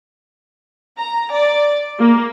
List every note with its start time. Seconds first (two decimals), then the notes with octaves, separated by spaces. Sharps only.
0.97 A#5
1.33 D5
1.98 A#3